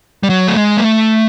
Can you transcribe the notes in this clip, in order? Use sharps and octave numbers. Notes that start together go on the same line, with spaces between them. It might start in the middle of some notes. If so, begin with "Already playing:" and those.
G3
F#3
A3
G#3
A#3
A3